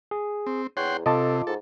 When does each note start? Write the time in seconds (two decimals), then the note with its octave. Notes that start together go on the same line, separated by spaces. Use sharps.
0.11 G#4
0.47 C4
0.77 E2 C#5 F#5 G5 C6
1.06 C3 F4 A4 D#5 A5 D6
1.47 G#2 A4